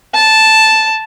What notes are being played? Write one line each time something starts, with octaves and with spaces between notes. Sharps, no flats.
A5